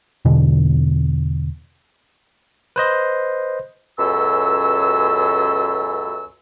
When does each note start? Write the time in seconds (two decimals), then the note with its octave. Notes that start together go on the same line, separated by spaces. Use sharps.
0.25 E2 B2 D3
2.76 B4 C5 D#5
3.99 C#2 F#2 B2 A4 E6